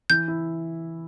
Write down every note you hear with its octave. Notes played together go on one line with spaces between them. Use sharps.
E3 G6
E4